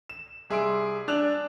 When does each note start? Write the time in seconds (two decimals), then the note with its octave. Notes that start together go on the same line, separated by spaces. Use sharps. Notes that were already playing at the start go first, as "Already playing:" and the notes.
0.10 E7
0.50 C2 G#4 E5 C6 E6 D7
1.08 D4 D5 E6 F#6 F7